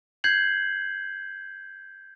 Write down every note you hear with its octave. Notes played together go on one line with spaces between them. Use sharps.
G6 G#6 C7 F#7